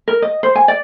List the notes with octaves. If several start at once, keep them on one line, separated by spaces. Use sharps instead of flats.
A#4
D#5
C5
G#5
D5